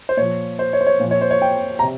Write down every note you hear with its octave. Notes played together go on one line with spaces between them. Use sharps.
C5
A#2 F3 C#5
C5
C#5
C5
C#5
A#2 F3
C#5
C5
C#5
G5
A#5
C3